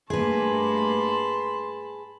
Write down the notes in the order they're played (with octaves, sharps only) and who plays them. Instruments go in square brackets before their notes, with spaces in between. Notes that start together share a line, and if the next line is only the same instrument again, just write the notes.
[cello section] G2 A3 A#3 [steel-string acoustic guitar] G#4 B4 [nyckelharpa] A5 B5 [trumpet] C6